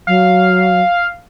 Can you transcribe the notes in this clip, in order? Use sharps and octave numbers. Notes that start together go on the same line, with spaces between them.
F#3 F5